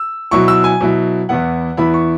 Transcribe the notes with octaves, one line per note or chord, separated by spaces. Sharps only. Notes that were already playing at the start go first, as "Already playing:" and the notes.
Already playing: E6
B2 F#3 E4 C#6
E6
G#5
B2 F#3 E4
E2 E3 B3 E4 F#5
E2 E3 B3 E4 B5
C#6